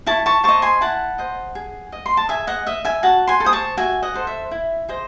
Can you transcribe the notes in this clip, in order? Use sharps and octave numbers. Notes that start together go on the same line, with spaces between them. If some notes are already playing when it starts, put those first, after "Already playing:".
E4 A5 C#6
A5 C#6
C5 D#5 A5 C#6
G#5 C6
E4 F#5 A5
C5 D#5
G#4
D#5
C6
A5
G#4 E5 G#5
D#5 F#5
D#5 E5
E5 G#5
F#4 F#5 A5
G#5 C6
A4
C5 D#6
A5 C#6
F#4 E5 G#5
D#5 F#5
A4 C5
E5
E4
G#4 C5 D#5